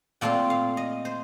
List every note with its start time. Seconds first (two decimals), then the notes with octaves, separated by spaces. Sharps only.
0.21 A#2 A3 C4 F4 G5
0.50 F5
0.77 D#5
1.05 C5